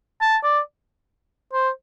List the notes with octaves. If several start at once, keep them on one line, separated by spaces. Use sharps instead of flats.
A5
D5
C5